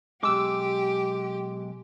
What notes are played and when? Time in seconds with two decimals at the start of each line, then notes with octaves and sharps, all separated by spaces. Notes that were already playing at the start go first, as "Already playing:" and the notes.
0.23 B1 G#3 G4 D6 E6